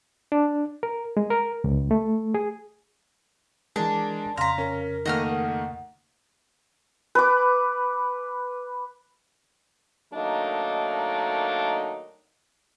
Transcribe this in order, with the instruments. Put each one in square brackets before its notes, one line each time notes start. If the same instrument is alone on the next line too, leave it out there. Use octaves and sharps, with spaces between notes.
[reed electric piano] D4
A#4
G#3
A#4
C#2
A3
G#4
[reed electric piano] E3 A#4 [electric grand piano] G#3 [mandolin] D4
[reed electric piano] F2 C#3 [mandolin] F5 A#5 [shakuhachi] C6 [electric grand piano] A#6 B6
[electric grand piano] C#4 [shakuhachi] A#4
[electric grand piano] D#3 A3 A#3 [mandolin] D#5 F#5 F6
[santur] B4 D6
[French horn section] D#3 F#3 A3 A#3 D4 D#4